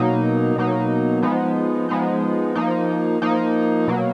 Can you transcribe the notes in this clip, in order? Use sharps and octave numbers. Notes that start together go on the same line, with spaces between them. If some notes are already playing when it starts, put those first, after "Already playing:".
Already playing: B2 F#3 A#3 D#4
B2 F#3 A#3 D#4
F3 G#3 B3 D#4
F3 G#3 B3 D#4
F3 A#3 D#4
F3 A#3 D#4
B2 F#3 A#3